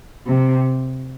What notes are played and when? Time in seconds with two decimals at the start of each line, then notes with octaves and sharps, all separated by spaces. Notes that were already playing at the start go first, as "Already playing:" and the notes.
0.27 C3